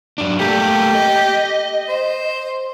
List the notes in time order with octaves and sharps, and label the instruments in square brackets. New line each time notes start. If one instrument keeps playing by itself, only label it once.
[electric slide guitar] F#2 D4
[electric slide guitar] A3 A#3 A4 [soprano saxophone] G4
[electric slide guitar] D#5
[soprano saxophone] C5